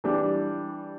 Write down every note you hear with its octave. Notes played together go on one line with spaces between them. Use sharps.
E3 G3 D4